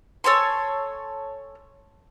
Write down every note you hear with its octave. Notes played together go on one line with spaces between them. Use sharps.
A4 C#5 G#5 C6